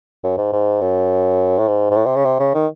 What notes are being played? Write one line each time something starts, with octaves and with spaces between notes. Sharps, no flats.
F#2
G#2
G#2
F#2
A2
G#2
G#2
A2
C3
C#3
C3
C#3
D#3